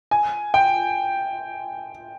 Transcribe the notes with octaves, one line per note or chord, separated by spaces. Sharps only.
G#5
G5